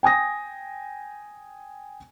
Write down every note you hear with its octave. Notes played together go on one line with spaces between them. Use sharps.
G5 G#5 D#6 A#6